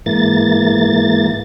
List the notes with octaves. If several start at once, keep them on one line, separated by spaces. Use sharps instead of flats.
G#2 E3 A#3 A6